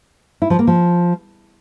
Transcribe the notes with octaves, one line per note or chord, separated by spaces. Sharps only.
E4
F3
A#3
F3